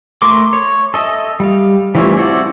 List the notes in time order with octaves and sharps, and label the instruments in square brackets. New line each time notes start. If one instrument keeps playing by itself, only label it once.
[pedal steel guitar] A3 A#4 C6 D6
C#5
A4 D#5 E5
G3 F5
E3 F3 G3 A3 C#4
C4 E4 F#4 A4 D5